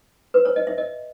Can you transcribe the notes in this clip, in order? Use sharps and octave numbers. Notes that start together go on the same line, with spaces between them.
B4
C#5
D#5
E5
D#5